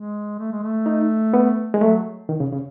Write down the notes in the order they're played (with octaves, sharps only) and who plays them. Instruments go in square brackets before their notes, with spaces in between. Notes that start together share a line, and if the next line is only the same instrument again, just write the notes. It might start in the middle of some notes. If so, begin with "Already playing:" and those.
Already playing: [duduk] G#3
A3
G#3
A3
[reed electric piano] D#4
B3
G#3
[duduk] F#3 [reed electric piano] A3
[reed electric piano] D#3
C#3
C#3